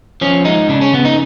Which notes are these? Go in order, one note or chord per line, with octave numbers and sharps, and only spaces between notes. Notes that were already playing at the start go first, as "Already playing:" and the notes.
F3 C#4
G#3 D#4
C#3 D4
C#4
C#3 B3
D#4